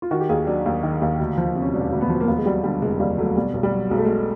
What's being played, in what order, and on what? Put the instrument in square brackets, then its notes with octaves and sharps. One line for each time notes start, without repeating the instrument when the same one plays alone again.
[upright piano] F4
D#3 F#4
G4
D#2 G#4
F#3 D4
D#2
D#3
D#2
D2
F3
C3
C#4
E1 D4
D2
B3
F3
A#3
D#2 B3
G#3
F#3 G3
D3 G3
F1 G#3
D#2 G3
F#3 A3
B2 G3
B1
G3
F#3
B1 G#3
A3
B2 G#3